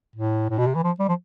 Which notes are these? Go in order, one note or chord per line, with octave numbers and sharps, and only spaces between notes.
A2
A2
B2
C3
E3
F3
G3
F3